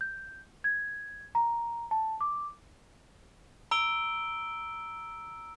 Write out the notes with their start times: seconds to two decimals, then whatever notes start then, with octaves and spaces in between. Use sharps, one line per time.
0.01 G6
0.64 G#6
1.35 A#5
1.91 A5
2.21 D6
3.71 A#5 E6 D7 G7